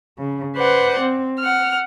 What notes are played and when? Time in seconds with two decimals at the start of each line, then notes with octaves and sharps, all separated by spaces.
0.18 C#3
0.56 B4 C5 D5 F#5
1.00 C4
1.40 F#5 F6